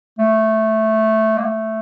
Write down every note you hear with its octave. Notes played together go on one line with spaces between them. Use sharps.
A3
A#3
A3